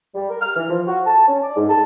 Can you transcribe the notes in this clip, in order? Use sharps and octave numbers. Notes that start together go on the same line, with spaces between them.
G3
A#4
F6
E3
F3
F#4
A5
C#4
D5
G#2
A5